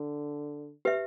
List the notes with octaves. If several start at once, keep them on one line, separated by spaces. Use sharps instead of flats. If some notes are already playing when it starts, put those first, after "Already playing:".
Already playing: D3
G4 B4 E5